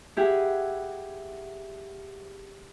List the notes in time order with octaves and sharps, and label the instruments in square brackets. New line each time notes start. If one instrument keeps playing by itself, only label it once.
[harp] E4 G4 G#4 F#5